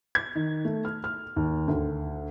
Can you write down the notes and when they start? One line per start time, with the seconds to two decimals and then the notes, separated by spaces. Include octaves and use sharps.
0.15 G#6
0.35 D#3
0.65 A3
0.85 F6
1.04 F6
1.36 D#2
1.68 D2